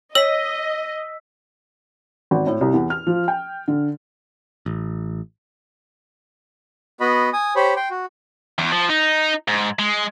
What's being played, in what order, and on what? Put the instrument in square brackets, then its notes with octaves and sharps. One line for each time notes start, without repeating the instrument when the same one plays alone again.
[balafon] C#5 [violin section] D#5 [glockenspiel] E6 B6 [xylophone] F#7
[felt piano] G#1
A2
C2
E2
F6
F3
G5
D3
[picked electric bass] A1
[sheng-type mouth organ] B3 F#4 D#5 B5
G#5 D#6
G4 C5 C#5 B5
G5 C6
F#4
[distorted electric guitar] E2
F3
D#4
G#2
G#3